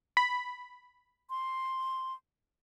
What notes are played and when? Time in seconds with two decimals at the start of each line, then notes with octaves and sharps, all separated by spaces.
0.17 B5
1.30 C6